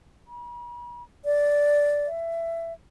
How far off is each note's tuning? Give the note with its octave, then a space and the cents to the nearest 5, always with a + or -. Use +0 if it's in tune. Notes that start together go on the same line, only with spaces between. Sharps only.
B5 -45
D5 -10
E5 +20